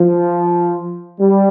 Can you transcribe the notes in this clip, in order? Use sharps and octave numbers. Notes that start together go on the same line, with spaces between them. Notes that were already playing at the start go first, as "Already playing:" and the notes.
Already playing: F3
G3